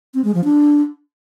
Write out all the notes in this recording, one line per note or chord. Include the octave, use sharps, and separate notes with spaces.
C4
G#3
F3
D4